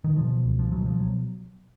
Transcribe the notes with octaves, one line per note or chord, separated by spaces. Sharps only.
D#3
B2 F3
C#2
F3
B2 F#3
F3
F#3